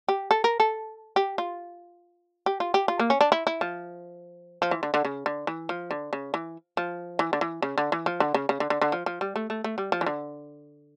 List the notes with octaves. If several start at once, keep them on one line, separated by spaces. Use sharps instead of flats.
G4
A4
A#4
A4
G4
F4
G4
F4
G4
F4
A#3
C#4
D4
E4
E4
F3
F3
E3
D3
D3
C#3
D3
E3
F3
D3
C#3
E3
F3
E3
D3
E3
C#3
D3
E3
F3
D3
C#3
C#3
D3
D3
D3
F3
F3
G3
A3
A3
A3
G3
F3
E3
D3